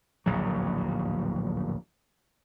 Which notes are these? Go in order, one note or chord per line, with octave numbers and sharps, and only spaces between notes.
D1 A#1 D#2 F#3